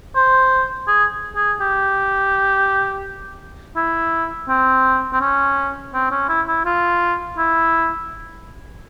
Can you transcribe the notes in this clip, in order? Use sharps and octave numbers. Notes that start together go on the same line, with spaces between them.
C5
G#4
G#4
G4
E4
C4
C4
C#4
C4
C#4
E4
E4
F4
E4